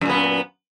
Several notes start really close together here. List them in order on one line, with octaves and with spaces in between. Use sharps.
F#2 A#2 B3